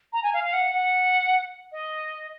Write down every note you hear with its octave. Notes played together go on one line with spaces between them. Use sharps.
A#5
G#5
F5
F5
F#5
F#5
D#5